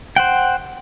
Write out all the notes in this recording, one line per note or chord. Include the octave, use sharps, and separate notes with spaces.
C5 F#5 G5